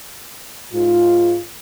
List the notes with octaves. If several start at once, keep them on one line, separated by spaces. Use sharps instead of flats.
G#2 F4